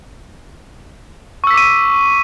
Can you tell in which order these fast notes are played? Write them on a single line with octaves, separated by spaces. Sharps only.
C#6 E6 B6 D6 D#7